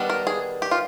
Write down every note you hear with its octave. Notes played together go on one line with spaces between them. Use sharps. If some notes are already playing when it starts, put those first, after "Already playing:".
Already playing: D#3 G3 B3 D4
A#4
G#4
G4
F4